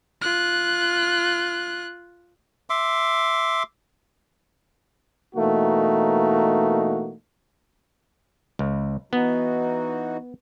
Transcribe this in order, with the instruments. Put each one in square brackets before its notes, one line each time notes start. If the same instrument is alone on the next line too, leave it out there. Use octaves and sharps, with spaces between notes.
[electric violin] F4 F#6
[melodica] E5 C6 D6
[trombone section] B2 E3 A3 A#3 D#4 F#4
[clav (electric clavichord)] C#2
[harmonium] E3 D#4 F#4 [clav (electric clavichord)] B3